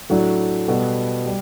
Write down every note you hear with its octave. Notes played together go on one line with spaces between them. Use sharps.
A2 F#3 A3 D4 F#4
B2 G3 B3 F#4 A4
G3